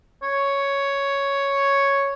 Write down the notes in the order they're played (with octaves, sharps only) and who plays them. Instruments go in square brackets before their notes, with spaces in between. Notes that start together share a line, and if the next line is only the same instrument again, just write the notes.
[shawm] C#5